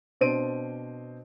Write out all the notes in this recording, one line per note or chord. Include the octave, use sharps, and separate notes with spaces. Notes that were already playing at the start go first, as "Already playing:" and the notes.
B2 C4 D4 C5 D7 D#7